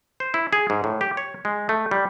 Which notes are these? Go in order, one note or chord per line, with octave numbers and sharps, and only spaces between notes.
C5
E4
G#4
G#2
A2
G4
C#5
G#3
A3
G3